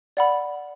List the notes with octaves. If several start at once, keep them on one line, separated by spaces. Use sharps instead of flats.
D5 F#5 B5